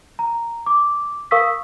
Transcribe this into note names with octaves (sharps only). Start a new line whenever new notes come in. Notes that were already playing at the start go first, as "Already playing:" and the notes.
A#5
D6
A#4 F5 C#6 D#6 E6 B6